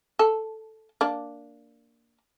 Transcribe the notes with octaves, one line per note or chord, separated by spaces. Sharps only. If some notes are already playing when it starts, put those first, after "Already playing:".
A4
A#3 D4